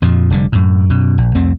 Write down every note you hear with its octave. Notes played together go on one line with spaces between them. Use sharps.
F2 A#2 F3
F1 D3 G3
F#2 A2
F#2 B2
A#1
C2 F2 A3 C4